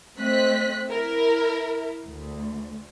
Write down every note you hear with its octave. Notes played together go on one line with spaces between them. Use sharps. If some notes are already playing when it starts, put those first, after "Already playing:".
A3 C4 C5 D#5 F#6 B6
E4 A#4
D2